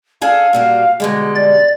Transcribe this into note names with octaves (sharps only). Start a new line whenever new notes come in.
D4 G#4 A4 F5
A#2 G3 F#4
B2 D3 G3 G#3
D5 A6